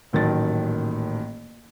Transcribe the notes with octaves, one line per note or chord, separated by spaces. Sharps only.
D#1 A1 D#3 F#3 A3 A6